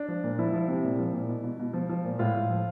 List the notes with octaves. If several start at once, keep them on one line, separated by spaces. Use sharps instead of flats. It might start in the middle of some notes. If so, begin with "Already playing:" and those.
Already playing: D4
F3
A#2
F3 E4
F3
C3
A#2
F3
A#2
B2
B2
B2
F3
F3
A#2
A2 F4
A2
F3